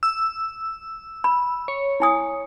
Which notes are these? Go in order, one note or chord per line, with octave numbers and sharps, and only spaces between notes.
E6
B5
C#5
E4 G#5 D#6